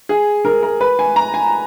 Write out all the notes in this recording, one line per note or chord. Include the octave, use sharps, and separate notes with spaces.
G#4
A#4
A#4
B4
G#5
A#5
G#5